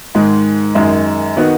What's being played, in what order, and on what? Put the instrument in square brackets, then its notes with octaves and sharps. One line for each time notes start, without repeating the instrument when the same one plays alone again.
[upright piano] G#2 D#3 G#3
F#2 D#3 G#3
D#3 B3 F#4